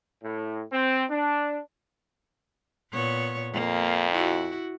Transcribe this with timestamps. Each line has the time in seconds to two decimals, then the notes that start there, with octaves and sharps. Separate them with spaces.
0.23 A2
0.72 C4
1.09 D4
2.91 A#2 B3 C#5
3.53 F2 A#3
4.13 E4 F#4